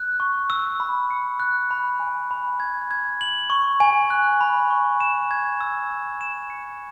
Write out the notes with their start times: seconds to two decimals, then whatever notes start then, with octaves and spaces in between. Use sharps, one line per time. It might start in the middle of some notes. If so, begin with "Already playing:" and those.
Already playing: F#6
0.20 C#6
0.50 E6
0.80 B5
1.10 C#7
1.40 F#6
1.71 B5
2.00 G#5
2.31 B5
2.60 G#6
2.91 G#6
3.21 F#7
3.50 C#6
3.80 G#5
4.10 F#6
4.41 B5
4.70 C#6
5.00 E7
5.31 G#6
5.61 E6
5.91 E6
6.21 E7
6.50 C#7